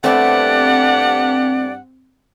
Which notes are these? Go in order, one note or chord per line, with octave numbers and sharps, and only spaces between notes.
G2 A3 B3 C4 G4 D5 F#5